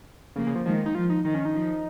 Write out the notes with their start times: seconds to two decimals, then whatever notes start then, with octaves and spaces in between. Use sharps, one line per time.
0.36 C#3 F3 A#3
0.47 C#3
0.55 F3
0.65 D#3 F3 G#3
0.86 D#4
0.95 F3 F4
1.10 D#4
1.24 D#3 D#4
1.35 C#4
1.45 D#4
1.54 F3